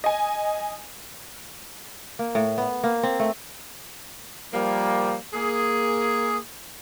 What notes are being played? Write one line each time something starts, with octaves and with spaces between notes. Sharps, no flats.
D#5 G#5
A#3
A2
B3
A#3
C4
A3
F3 G3 A#3
A#3 G#4